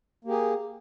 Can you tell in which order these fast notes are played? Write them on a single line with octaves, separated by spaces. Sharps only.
A#3 G4 G#4